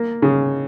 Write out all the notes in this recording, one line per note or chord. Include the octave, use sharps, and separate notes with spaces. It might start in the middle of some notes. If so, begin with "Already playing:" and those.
Already playing: A#3
C#3